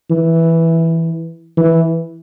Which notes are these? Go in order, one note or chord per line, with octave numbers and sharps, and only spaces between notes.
E3
E3